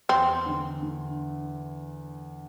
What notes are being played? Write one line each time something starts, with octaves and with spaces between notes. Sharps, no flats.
E2 C4
D3
D3